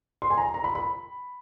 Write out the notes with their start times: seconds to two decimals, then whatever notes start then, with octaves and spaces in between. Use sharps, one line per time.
0.22 C6
0.30 G#5
0.38 A#5
0.54 A#5
0.64 B5
0.75 B5